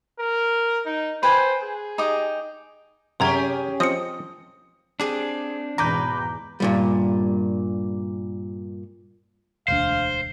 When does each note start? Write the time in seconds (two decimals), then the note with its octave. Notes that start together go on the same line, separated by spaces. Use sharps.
0.19 A#4
0.85 D#4
1.23 B4 C5 G5 G#5
1.63 G#4
1.98 D#4 G4 D#6
3.20 F#2 C3 C#4 G4 G#4 C#5 A#5 G#6
3.80 F3 C4 D#5 D#6 C#7
5.00 C4 D4 G4 G#4 G#5
5.78 E2 G#2 B2 B4 G#5 A#5 D6 G6
6.60 G2 A#2 G3
9.68 E1 D2 D4 C5 F5